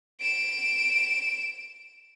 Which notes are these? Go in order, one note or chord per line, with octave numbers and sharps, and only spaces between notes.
D7 E7